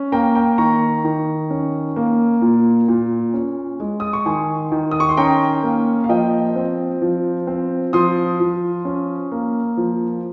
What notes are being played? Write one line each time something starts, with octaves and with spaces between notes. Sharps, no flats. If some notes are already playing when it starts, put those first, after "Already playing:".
Already playing: C#4
A#3 G5 A#5
G5 A#5
D#3 A#5 C#6
D#3
C#4
A#3
A#2
A#2
C#4
G#3
D#6
C#6
D#3 G#5 C6
D#3
D#6
C#6
C6
C#4 G5 A#5
A#3
F5
F3 D#5 G5
C4
F3
C4
F3 C6 D#6
F3
C#4
A#3
F3